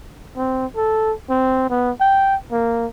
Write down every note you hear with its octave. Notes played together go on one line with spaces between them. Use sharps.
C4
A4
C4
B3
G5
A#3